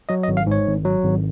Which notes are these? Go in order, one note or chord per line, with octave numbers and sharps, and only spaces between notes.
F#3 D#5
D#5
G#1
F5
G#2 C#5
G#1
F#3
G#1